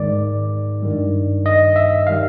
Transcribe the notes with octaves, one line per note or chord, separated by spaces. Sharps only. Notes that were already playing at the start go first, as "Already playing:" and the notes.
Already playing: G#2 D#3 G#3 D5
G2 D#3 G3
D#5
E5
D#3 G3 F5